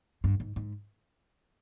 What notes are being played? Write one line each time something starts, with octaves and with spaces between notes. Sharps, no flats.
G2
G#2
G#2